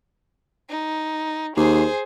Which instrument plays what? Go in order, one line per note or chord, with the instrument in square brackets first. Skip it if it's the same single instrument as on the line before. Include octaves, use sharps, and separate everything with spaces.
[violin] D#4
[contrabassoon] D#2 [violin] G#4 C5